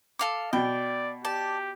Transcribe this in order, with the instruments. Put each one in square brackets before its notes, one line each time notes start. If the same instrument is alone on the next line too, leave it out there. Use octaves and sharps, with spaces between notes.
[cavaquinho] A4 F5 D6
[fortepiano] B2 [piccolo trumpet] D5 [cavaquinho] G5
[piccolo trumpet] G4 [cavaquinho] D5 A5